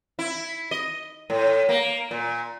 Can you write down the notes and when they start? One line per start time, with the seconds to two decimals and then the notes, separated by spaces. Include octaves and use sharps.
0.19 E4
0.71 D#5
1.30 A2
1.69 A#3
2.11 A#2